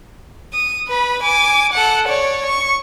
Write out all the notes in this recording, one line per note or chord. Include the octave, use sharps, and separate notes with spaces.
D#6
B4 B5
G#5 D6
A4 F#5
C#5 D5
C#6